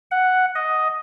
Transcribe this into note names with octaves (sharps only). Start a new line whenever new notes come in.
F#5
D#5